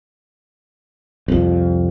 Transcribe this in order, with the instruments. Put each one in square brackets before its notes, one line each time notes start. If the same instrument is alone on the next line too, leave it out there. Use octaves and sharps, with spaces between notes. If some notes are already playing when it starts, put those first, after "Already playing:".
[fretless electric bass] C2 F2